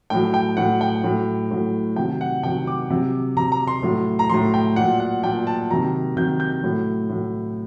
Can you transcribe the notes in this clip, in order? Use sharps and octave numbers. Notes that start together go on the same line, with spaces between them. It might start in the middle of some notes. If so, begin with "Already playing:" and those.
A2 F#3 G5
G5
A2 F#3 F#5
G5
A2 F#3
A2 F#3
C3 D#3 F#3 G5
F#5
C3 D#3 F#3 G5
D6
C3 F#3
C3 F#3 A#5
A#5
C6
A2 F#3
A#5
A2 F#3 C6
G5
A#2 F#3 F#5
F#5
A#2 F#3 G5
A5
C3 D#3 F#3 A#5
C3 D#3 F#3 G6
G6
A2 F#3
A2 F#3